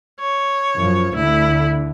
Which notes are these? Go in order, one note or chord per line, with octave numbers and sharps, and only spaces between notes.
C#5
F#2 F3
D2 D3 E4